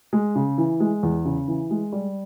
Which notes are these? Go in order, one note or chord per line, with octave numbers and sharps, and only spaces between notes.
G#3
C#3
E3
G#3
E2
C#3
E3
G#3
G3